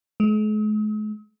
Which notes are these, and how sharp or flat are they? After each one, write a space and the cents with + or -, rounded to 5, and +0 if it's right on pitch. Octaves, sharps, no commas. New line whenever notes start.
G#3 +45